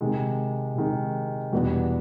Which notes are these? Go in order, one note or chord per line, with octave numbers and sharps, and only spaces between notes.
C3 D#3 G#3
C3 D#3 G#3
E2 B2 G3 B3 D4